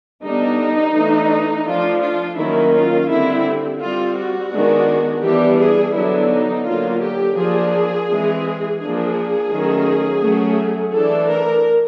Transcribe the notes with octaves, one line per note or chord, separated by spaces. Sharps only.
D3 G3 B3 D4 D#4
E3 A3 D4
F3 A3 D4 F4
F4
D#3 F#3 A#3 C#4 E4
F4
D3 G3 C4 E4
G3 C4 F4
F#4
D#3 G#3 B3 D4
E3 G3 B3 D4 G4
G#4
D3 F#3 B3 D4 E4
D#4
D3 F#3 A#3 F4
G4
F3 A#3 D4 G#4
E3 G#3 C4
F3 A#3 D4 G#4
D#3 F#3 A3 C#4
F#3 A3 C#4
E3 A3 D4 A4
A#4